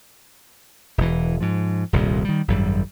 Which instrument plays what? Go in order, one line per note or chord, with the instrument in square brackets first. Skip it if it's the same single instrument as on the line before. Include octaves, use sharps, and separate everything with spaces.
[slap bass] E1 E3
G#2 F3
D#1 C2 G2 A#2
D#3 G3
G#1 F#2 G3